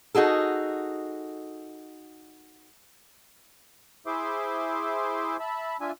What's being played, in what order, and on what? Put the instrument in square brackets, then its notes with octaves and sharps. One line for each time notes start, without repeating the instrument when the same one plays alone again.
[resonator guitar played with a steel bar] D#4 F#4 G#4 A4
[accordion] E4 G#4 C5 E5 C6 D6
E5 A5 B5
D4 F4 E5 G#5